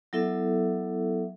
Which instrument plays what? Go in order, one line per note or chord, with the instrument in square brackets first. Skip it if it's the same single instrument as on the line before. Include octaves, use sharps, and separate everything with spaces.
[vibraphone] F#3 B3 E4 A4 E5